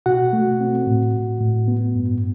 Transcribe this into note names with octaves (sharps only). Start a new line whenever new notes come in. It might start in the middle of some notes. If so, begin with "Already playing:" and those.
B2 F#4 F#5
A3
C4
A2
A2
A2
B3
G2